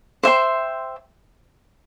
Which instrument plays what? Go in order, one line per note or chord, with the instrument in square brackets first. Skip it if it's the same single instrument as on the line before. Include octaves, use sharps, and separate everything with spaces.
[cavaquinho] C5 E5 G5 C6